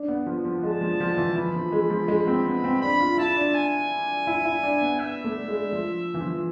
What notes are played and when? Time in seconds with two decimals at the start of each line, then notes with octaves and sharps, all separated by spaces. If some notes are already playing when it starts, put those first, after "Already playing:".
Already playing: D4
0.08 B3
0.26 F3
0.45 F3
0.63 G#3 A5
0.81 F3
1.00 F3
1.17 E3
1.36 E3 B5
1.54 F3
1.72 G#3
1.90 F3
2.08 G#3
2.27 C4
2.45 B3
2.64 C4
2.81 D4 B5
3.00 F4
3.18 E4 A5
3.36 D4
3.54 G#5
4.27 E4
4.45 E4
4.63 D4
4.81 B3
4.99 B3 E5
5.24 A3
5.48 G#3
5.72 F3
6.14 E3
6.20 F3